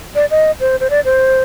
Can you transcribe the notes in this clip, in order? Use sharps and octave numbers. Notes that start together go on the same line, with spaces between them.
D5
D#5
C5
C5
D5
C5